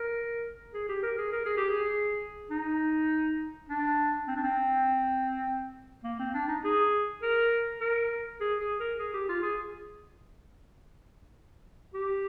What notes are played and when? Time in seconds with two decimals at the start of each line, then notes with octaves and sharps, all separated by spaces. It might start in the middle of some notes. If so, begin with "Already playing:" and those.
Already playing: A#4
0.74 G#4
0.89 G4
1.03 A#4
1.18 G#4
1.32 A#4
1.46 G#4
1.57 G4
1.70 G#4
2.51 D#4
3.69 D4
4.28 C4
4.36 D4
4.43 C4
6.04 A#3
6.19 C4
6.34 D4
6.48 D#4
6.64 G#4
7.22 A#4
7.81 A#4
8.41 G#4
8.60 G#4
8.80 A#4
8.99 G#4
9.14 G4
9.29 F4
9.43 G#4
11.94 G4